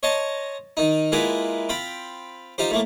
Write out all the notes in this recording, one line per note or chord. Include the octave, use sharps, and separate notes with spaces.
C#5 D#5 A5 A#5 C6
D#3 D#4
G#3 A#3 E4 F4 A#4 B4
C4 F4 G5 B5
D#4 F4 G4 C5
A2 A3 A#3